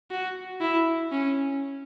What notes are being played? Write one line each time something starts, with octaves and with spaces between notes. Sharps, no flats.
F#4
E4
C#4